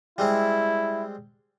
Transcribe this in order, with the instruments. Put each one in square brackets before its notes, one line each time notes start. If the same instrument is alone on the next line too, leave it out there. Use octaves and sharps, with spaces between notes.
[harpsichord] G3 G#3 C4 [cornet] E4